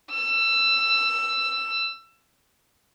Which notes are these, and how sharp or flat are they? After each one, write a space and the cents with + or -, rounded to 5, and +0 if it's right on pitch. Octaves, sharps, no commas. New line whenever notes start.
E6 +20